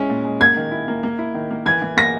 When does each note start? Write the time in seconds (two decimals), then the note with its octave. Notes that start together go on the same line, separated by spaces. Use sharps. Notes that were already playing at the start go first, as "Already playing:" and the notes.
Already playing: G#3 C#4 E4
0.10 A#2
0.24 G#3
0.40 A#3 G#6
0.57 D#3
0.71 E4
0.88 A#3
1.03 A#3
1.19 E4
1.34 D#3
1.50 A#3
1.66 E3 G#6
1.82 E3
1.97 A#3 A#6